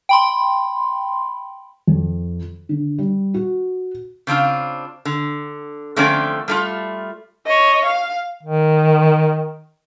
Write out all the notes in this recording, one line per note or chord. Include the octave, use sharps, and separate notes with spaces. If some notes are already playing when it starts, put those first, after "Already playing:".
G5 B5 C6
F2
D3
G3
F#4
C#3 C4 D4 F4
D3
D3 F3 A3 C4 C#4 D5
G3 A3 F4
C#5 D#5
F5
D#3